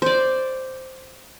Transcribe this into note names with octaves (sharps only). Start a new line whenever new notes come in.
C5 D5